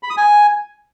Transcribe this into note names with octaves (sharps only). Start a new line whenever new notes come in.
B5
D#6
G#5